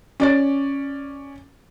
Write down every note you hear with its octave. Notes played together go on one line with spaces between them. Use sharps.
C#4 D5 A6